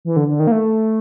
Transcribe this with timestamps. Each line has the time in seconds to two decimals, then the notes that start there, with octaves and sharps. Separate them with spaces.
0.05 E3
0.16 D3
0.28 D3
0.40 D#3
0.47 A#3
0.52 A3